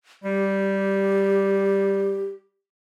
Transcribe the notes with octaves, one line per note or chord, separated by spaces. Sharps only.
G3 G4